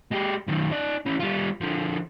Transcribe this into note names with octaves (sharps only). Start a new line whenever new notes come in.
G#3 G4
F#2 D#3
D#4 D5
E3 C#4
G3 F4
D3 F3